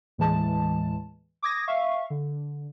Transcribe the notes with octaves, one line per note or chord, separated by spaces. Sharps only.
D#2 A2 E3 G#3 A5
D6 D#6 G#6 A#6
E5 F5 C#6
D3